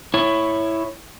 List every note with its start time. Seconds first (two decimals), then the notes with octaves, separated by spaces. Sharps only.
0.14 E4 C#5